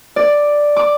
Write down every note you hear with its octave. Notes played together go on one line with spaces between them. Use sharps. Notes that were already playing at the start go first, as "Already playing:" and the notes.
D5
D6